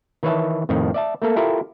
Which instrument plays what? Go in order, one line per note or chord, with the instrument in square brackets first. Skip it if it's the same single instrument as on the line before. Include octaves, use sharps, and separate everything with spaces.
[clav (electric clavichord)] D#3 E3 B4 C#5 E5 A5
F2 A2 D#3 F3
D5 E5 A5
A3 A#3 A4
E4 F4 G4 A4 A#4 E5